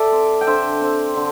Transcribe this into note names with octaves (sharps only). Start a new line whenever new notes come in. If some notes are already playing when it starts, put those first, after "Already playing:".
Already playing: A4 D5 E5
C4
G5
D3 C5 E5
C4
D3